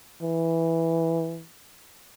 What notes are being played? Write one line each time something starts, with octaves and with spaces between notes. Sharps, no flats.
E3